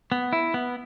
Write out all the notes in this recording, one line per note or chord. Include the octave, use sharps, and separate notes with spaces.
B3
E4
B3